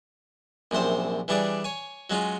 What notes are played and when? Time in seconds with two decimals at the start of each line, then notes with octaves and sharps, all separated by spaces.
0.71 A#1 F#2 C3 C5 C6
1.28 E3 G3 D4 G#4 D5
1.64 C#5 G#5
2.10 F#3 G#3 C#4 F4